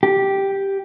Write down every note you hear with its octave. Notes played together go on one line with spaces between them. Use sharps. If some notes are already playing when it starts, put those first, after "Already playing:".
G4